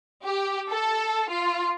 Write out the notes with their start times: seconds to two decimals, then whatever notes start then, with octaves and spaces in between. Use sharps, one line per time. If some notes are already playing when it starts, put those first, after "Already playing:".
0.23 G4
0.69 A4
1.30 F4